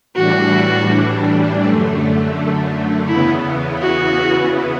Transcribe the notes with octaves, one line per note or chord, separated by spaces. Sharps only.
A2 E3 G3 D4 F#4
F#2 D3 A3
E2 C#3 E3 B3 E4
F#4